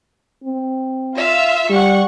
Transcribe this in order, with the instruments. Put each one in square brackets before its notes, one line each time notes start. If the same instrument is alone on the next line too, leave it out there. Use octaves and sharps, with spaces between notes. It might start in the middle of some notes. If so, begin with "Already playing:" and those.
[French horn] C4
[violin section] F4 E5 F5
[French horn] G3 [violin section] F#5 C#6